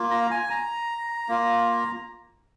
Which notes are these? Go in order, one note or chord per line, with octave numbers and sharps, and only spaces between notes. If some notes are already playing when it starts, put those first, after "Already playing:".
Already playing: A#3 F4
A#5
G#5
A#5
A#3 F4